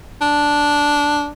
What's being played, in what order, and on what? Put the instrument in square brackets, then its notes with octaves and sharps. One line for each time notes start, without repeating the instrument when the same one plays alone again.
[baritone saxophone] D4